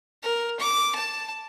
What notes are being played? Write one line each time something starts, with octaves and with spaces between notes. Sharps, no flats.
A#4
D6
A5